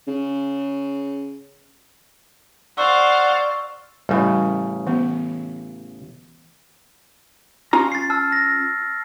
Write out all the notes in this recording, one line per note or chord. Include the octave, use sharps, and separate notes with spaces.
C#3
C5 D5 F5 F#5 C#6 E6
A1 C#3 G3 E4
E3 B3
C#4 F4 A#5
A6 C7
A5 E6 F6
A#6